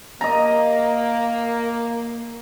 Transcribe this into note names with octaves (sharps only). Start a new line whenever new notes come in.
A#3 D#5 A#5